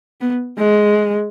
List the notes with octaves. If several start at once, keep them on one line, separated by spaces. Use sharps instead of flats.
B3
G#3